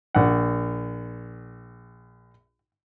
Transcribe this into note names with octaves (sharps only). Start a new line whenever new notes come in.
A#1 F#5